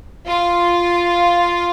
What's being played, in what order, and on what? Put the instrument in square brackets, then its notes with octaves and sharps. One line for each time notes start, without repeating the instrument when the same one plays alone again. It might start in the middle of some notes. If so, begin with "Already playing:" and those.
[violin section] F4